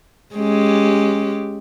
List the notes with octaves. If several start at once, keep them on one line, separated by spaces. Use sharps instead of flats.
G#3 C#4 G4